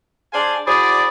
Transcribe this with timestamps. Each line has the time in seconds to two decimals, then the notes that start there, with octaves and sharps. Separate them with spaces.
0.33 D4 G#4 C5 D5 F5 G#5
0.67 E4 F#4 G#4 C5 D5